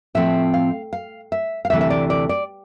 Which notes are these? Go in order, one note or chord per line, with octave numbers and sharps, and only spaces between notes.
A2 F3 A3 C4 E5
F5
F5
E5
F5
D2 C3 E3 A3 E5
E5
D5
D5
D5